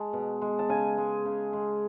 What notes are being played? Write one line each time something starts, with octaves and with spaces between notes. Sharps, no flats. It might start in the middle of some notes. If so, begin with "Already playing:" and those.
Already playing: G#3 A5
B2
G#3
A5
C#3 G#5
G#3
C#3
G#3